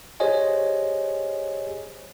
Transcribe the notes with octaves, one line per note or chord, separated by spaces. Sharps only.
G4 G#4 C5 C#5 D#5 G#5